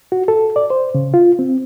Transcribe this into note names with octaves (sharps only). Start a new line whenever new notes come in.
F#4
A4
D5
C5
C#3
F4
C4